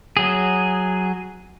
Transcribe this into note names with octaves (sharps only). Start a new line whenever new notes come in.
F#3 G#4